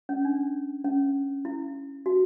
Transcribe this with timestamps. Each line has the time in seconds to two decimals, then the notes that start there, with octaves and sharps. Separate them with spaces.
0.09 C#4
0.25 D4
0.84 C#4
1.45 E4
2.06 F#4